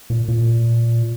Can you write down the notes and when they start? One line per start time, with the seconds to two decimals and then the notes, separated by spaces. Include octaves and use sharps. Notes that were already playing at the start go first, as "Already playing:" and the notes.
0.10 A#2
0.28 A#2